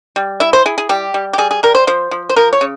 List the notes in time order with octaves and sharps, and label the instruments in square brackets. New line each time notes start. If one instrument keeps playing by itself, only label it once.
[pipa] G3
E4 E5
C5
E4 G#4
G#4
G3 G4
G3
G4
G3 G#4
G#4
G3 A#4
C5
F3 C5
F3
C5
F3 A#4
C#5
C#3